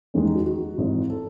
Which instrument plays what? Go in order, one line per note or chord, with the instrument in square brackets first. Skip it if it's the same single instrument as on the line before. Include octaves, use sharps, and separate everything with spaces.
[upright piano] E2 D#3 G#3 C#4
D#4
F#4
F#4
G#1 G#2 E3
A4